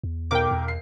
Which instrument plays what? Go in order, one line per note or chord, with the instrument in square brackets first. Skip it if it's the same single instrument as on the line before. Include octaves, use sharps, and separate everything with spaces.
[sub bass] E2
[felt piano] B1 A#4 [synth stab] G5 D6
[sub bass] E2
[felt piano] C7